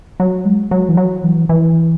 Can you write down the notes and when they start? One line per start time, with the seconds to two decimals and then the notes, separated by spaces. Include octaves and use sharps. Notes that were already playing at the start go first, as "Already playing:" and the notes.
0.20 F#3
0.45 G#3
0.71 F#3
0.89 E3
0.97 F#3
1.24 E3
1.49 E3